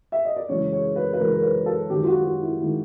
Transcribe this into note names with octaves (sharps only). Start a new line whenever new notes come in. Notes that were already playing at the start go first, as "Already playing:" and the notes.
E5
D#5
D5
F#2 C#3 E3 G#3 C#5
C#5
B4
B4
F#2 C#3 E3 G#3 A#4
A#4
B4
A4
F#2 D#3 G#3 G4
F4
F#4
F4
E4
D#3 G#3 E4